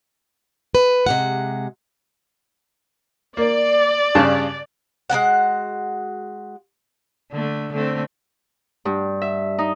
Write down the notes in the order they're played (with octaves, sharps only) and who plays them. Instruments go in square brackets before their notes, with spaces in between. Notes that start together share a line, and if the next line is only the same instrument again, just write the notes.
[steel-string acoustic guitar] B4
C3 G#3 F#5
[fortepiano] A#3 [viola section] D5
[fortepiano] G2 C#3 A5
[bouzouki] G#3 B3 F#4 F#5
[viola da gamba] D3 A3
D3 A3 C4
[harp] G2
E5
D#4